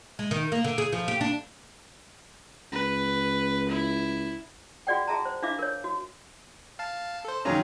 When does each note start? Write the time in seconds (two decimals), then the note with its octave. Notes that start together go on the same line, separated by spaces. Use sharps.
0.19 G#3
0.31 D#3
0.52 A#3
0.64 D3
0.78 G#4
0.93 F3
1.08 G4
1.21 D4
2.72 C#2 B4
3.69 E4
4.87 F4 F#4 G#4 D5 F#5 G5
5.08 F#4 G#4 E5 A5 A#5
5.25 C5
5.42 D4 F4 E5 F5 D6
5.59 A#4 C#5
5.84 F#4
6.79 F5 A5
7.25 A4 C5
7.45 D#3 F#3 C#4 F4 G#4 A#5